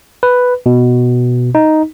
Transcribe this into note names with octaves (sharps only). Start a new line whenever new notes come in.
B4
B2
D#4